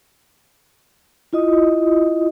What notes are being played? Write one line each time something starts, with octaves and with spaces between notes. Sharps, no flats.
E4 F4 D#5 D#6